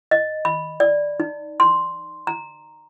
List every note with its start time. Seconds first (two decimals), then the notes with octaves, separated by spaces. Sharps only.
0.11 D#5
0.45 B5
0.80 D5
1.20 D#4
1.60 C6
2.27 A#5